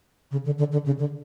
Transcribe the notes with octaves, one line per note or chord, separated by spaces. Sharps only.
C#3
D3
D3
D3
C#3
D3